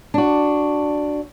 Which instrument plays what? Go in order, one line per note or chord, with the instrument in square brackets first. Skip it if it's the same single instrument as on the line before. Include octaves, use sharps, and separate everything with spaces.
[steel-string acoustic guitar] D4 F#4